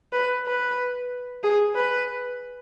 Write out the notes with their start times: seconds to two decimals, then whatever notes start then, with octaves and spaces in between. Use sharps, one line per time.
0.12 B4
0.46 B4
1.43 G#4
1.76 B4